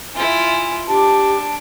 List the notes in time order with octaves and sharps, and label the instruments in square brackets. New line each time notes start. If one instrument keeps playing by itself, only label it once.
[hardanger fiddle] E4 F4 [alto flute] G#5
[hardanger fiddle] D4 [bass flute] G4 [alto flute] A5